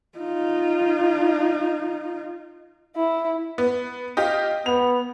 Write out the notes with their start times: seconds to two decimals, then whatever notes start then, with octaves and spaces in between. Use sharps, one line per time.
0.18 D#4 F4
2.95 E4
3.58 B3
4.17 F4 G4 D#5
4.66 B3 F7